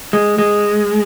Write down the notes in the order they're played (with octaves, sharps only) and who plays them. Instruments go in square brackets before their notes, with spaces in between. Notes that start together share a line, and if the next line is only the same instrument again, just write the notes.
[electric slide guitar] G#3
G#3